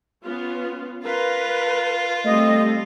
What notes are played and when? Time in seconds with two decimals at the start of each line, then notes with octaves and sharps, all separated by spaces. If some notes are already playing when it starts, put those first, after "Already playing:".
0.24 B3 C#4 F4
1.04 F4 A#4 B4
2.25 G3 A3 C4 A4 D#5